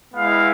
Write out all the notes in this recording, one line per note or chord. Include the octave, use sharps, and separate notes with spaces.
G#3 B3 E4 F5